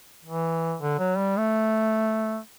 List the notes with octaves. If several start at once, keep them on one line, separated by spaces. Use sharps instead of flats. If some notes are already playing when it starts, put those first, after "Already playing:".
E3
D3
F#3
G3
A3